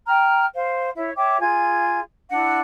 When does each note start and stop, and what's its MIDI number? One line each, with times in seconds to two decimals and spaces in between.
0.06 0.45 79
0.06 0.45 82
0.06 0.45 89
0.56 0.90 72
0.56 0.90 77
0.96 1.11 64
0.96 1.11 73
0.96 1.11 76
1.16 1.37 73
1.16 1.37 76
1.16 1.37 79
1.16 1.37 86
1.39 1.99 65
1.39 1.99 68
1.39 1.99 80
1.39 1.99 92
2.31 2.59 62
2.31 2.59 64
2.31 2.59 78